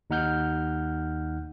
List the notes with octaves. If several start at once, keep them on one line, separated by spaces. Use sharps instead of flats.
D#2 D#4 F#5 F6 G6